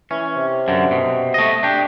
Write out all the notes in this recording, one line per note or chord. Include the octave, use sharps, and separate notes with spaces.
E3 C#4
C3
F#2 D3
B2
A3 D#5
D4 G4